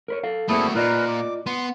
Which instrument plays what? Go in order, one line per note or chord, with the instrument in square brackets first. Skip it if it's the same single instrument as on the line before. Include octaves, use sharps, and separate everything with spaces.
[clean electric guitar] A#4 B4 C#5
A4 F5
[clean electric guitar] G2 A#3 C4 [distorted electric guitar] A3 F#4 [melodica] E4 G#4 A4
[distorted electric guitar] A#2 [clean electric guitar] F4 D5 D#5 [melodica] A#4 B4
[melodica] D6
[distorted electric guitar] B3 [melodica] C6